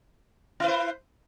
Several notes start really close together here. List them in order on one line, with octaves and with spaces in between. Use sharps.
E4 B4 C5